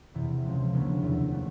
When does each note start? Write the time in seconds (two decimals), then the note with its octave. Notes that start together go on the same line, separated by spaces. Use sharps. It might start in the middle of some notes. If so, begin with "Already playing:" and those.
0.14 E2 C3 E3
0.44 C#2 C#3 F3 G#3
0.73 D2 C#3 E3 G3 A#3
1.02 E2 C3 D#3 F#3 B3
1.31 C#3 F3 A3 D4